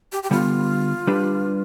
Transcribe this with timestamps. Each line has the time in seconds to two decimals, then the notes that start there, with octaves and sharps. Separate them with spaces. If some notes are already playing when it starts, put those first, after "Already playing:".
0.12 G4
0.23 G4
0.31 D3 G3 B3 F4
1.07 G3 D4 G4 B4